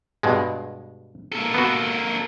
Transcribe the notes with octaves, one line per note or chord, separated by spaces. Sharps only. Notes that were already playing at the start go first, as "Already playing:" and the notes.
G2 B2 G#3
A#3 A4
B3 F#4